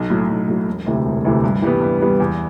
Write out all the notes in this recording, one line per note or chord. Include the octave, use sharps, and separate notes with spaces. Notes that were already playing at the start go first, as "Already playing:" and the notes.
Already playing: B1
A2 F#3
B1
A2 F#3
E1
D2 C3 E3 A3
E1
D2 C3 E3 A3
G2
E3 G3 B3
G2
E3 G3 B3
E2